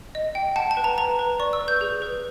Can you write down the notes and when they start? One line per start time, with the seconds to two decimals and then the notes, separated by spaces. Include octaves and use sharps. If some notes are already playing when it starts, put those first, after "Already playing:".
0.15 D#5
0.35 G5
0.56 F#5 A5
0.71 A5
0.77 B4
0.84 A#5
0.98 B4 A#5
1.19 B4
1.39 D5 C#6
1.53 E6
1.61 B4
1.68 G6
1.81 G#4
2.02 B4